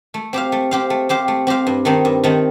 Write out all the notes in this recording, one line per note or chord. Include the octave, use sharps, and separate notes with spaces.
A3
C4 G4 C5 F5
A3
C4 G4 C5 F5
A3
C4 G4 C5 F5
A3
C4 G4 C5 F5
G2
D#3 A3 C4 D#4
G2
D#3 A3 C4 D#4